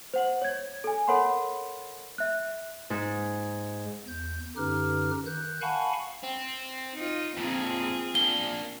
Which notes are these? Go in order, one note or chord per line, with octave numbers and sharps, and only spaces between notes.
C5 F#5 F#7
C#5 G#6
A4 G#5
A4 A#4 C#5 F#5 B5 C6
E5 F#6
G#2
E2 G6
F#2 D3 D#4 G4 B4 F6
D#3 F#6 G6
F5 F#5 G#5 A5 B5 C#6
C4
D#4 F4
F2 A#2 C4 F4 G#4
A#3 D4 G7